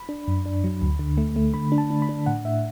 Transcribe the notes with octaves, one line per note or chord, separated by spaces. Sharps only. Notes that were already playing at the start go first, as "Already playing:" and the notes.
Already playing: B5
D4
F#2
D4
F#3
D2
D3
A3
A3
D3 B5
D4
A5
D4
B5
D4
A2 F#5
A2 E5